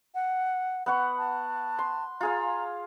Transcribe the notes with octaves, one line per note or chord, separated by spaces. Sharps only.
F#5
B3 F#5 C#6
A5
C6
F4 G#4 F5 A#5